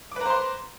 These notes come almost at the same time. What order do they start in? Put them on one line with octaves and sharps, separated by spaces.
D6 B4 A#5 C5 C6